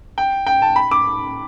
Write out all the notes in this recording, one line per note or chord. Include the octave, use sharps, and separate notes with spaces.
G5
G5
A5
B5
D6